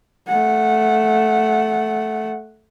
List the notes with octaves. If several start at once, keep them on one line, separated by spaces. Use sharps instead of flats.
A3 F#5